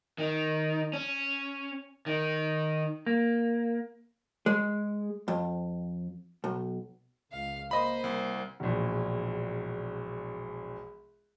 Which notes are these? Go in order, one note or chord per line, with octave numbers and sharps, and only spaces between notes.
D#3
C#4
D#3
A#3
G#3
F2
B1
C#2 F5
A#3 C5 D#5 B5
C2
E1 A#1